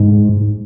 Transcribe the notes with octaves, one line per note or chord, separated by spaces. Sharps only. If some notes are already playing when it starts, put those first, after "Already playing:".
Already playing: G#2